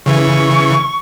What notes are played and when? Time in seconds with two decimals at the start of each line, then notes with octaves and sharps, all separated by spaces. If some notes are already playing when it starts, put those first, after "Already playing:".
0.06 C#3 E3 C#6